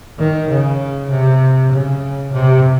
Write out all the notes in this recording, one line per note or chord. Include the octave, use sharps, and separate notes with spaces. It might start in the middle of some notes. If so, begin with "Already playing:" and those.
D#3
C#3
C3
C#3
C3